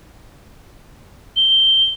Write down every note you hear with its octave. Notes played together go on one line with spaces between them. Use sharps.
G7